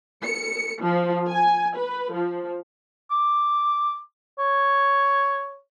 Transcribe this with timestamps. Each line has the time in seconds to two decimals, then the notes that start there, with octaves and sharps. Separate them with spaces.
0.24 C#7
0.82 F3
1.28 G#5
1.76 B4
2.13 F3
3.11 D6
4.39 C#5